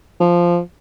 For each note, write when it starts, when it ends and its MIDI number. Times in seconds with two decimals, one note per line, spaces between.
0.20 0.59 53